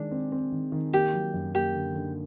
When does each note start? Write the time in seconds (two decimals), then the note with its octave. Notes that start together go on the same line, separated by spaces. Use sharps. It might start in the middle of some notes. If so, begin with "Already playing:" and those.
Already playing: D#3 G#3 D4
0.11 C4
0.32 C4
0.52 D#3
0.72 D#3
0.93 A#3 G4
1.13 F#3
1.34 F#2
1.54 A#3 G4
1.75 D3
1.95 D3